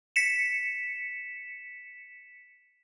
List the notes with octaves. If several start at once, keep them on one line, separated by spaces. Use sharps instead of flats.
B6 C#7 E7